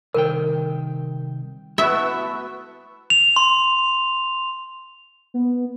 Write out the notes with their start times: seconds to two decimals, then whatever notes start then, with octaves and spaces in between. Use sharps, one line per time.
0.14 C2 D#3 A#4 G5
1.78 A3 B3 E4 F#4 E5 C#6
3.10 F7
3.36 C6
5.34 B3